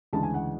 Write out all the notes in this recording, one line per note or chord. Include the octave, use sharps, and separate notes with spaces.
D2 C#3 E3 G#3 A5
G#5
F#5